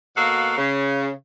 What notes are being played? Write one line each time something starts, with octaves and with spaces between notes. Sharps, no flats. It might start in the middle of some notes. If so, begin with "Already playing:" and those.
B2 A#3 F#4 A4 F5 F#5
C#3